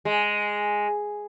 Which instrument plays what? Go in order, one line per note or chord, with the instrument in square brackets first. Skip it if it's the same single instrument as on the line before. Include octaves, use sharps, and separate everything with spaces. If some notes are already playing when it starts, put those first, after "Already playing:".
[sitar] G#3